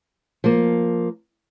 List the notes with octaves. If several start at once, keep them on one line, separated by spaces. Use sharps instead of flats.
F3 A#3